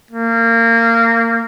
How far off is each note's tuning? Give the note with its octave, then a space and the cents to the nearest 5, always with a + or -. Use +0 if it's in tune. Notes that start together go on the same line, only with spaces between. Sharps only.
A#3 -25